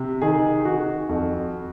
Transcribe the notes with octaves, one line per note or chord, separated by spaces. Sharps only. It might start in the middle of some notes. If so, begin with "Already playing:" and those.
Already playing: C3
D#3 G#4
D#3 F#4
F2